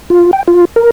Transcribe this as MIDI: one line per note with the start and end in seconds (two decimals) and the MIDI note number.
0.10 0.31 65
0.33 0.43 79
0.48 0.65 65
0.76 0.91 70